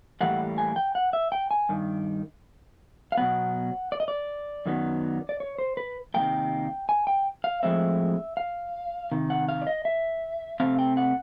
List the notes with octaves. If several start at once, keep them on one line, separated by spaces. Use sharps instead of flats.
A2 E3 G3 A#3 F#5
G#5
G5
F#5
E5
G5
G#5
G2 D#3
F5
B2 F#3 B3 F#5
D5
D#5
D5
F#2 D#3 F#3 B3
D5
C#5
C5
B4
C3 D#3 G3 A#3 G5
G#5
G5
F5
A2 F3 G#3 C4 E5
F5
C3 D#3
F#5
F5
D5
D#5
E5
C3 F3 A3 C4 F5
G5
F#5